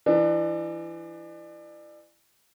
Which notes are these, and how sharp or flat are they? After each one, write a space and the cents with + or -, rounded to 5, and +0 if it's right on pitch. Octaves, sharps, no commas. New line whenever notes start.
E3 +20 D4 +35